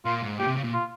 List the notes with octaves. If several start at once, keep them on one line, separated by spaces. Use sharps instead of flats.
A#2 F4
G#2
A#2 G4
C3
C#3
A#2
F4